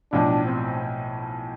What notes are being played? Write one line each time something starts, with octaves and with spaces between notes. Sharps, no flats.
B1 A2 F3 D4
C4